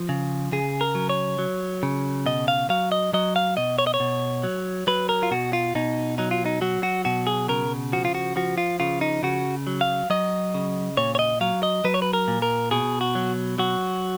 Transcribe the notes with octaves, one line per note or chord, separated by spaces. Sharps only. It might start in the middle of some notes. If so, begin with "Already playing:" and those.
Already playing: F3
C#3
C#3 G#4
A#4
F#3
C#5
F#3
C#3
B2 D#5
F5
F#3 F5
D#5
F#3 D#5
F5
B2 D#5
C#5
D#5
C#5
B2
F#3
F#3 B4
A#4
F4
B2 F#4
F4
B2 D#4
F#3 D#4
F4
D#4
F#3 F#4
F#4
B2 F#4
G#4
C#3 A#4
F3 F#4
F4
F#4
F3 F#4
F4
C#3 F4
D#4
C#3 F#4
F#3
F5
F#3 D#5
C#3
A#2 C#5
C#5
D#5
F#3 F5
D#5
F#3 B4
C#5
B4
A#4
A#2
A#4
B2 G#4
F#4
F#3
F#3 F#4